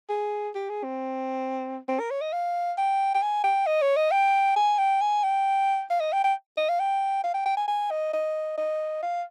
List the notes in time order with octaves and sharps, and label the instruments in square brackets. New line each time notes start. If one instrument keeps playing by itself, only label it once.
[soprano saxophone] G#4
G4
G#4
C4
C4
A#4
C#5
D#5
F5
G5
G5
G#5
G5
D#5
C#5
D#5
G5
G#5
G5
G#5
G5
F5
D#5
G5
G5
D#5
F5
G5
F5
G5
G5
G#5
G#5
D#5
D#5
D#5
F5